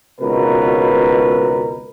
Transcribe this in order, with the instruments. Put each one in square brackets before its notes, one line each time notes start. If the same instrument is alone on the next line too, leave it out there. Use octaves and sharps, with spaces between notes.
[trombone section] G#1 C#2 B2 A#4 B4